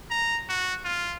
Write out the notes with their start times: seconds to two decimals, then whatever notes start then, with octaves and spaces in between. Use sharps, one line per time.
0.10 A#5
0.49 F#4
0.85 F4